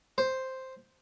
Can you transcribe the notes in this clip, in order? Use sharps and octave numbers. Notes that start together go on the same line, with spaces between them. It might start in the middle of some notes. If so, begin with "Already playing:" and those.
C5